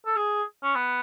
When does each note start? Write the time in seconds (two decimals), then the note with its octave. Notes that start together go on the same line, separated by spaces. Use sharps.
0.06 A4
0.16 G#4
0.63 C#4
0.75 B3